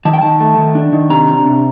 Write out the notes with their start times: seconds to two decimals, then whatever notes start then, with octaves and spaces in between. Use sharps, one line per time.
0.05 D#3 A5
0.13 G5
0.21 D#3 A5
0.40 A3
0.58 D#3
0.75 D4
0.93 D#3
1.10 C3 A#5
1.28 D4
1.45 C3